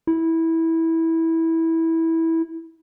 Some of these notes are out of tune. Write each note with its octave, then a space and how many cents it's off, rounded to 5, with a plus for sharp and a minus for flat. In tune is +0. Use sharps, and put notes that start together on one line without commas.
E4 -15